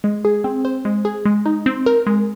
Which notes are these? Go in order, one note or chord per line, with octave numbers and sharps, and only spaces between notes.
G#3
G#4
C4
C5
G#3
G#4
G#3
D#4
C4
A#4
G#3